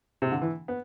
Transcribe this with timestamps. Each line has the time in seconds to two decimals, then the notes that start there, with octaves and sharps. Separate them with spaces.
0.22 C3
0.32 D3
0.42 E3
0.68 B3